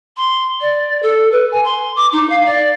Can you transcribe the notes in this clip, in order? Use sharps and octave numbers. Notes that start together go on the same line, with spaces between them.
C6
D5
A4
B4
G#5
C6
D6
D#4
F5
D5